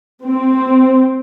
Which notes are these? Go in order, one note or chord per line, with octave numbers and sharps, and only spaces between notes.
C4